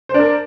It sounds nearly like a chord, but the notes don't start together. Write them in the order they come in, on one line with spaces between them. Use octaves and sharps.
C5 D4 A#4